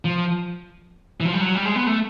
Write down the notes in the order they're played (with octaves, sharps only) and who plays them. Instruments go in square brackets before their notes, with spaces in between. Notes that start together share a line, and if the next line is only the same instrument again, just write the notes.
[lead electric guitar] F3
E3
F3
G3
F#3
G3
G#3
B3
A3